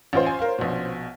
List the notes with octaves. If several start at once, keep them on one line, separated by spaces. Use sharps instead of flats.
A1 C#4 F4 C5
G#5
A#4 F5
A#1 B2